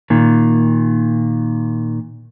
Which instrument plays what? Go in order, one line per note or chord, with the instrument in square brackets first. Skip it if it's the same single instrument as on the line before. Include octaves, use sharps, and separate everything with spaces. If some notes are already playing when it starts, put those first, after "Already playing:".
[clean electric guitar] A#2 D#3